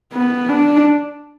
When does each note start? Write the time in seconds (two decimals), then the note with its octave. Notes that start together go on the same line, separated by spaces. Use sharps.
0.13 B3
0.49 D4